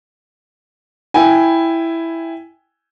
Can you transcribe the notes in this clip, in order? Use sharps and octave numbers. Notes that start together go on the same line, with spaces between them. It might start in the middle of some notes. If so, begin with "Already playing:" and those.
E4 G5 G#5